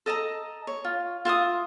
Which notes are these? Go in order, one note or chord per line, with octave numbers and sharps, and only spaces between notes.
A4 D#5 A5 A#5
C#5
F4
F4 E5 F5 D#6